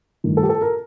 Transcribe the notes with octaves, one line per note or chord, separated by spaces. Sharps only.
G2 D#3 A3
A4
G4
A4
A#4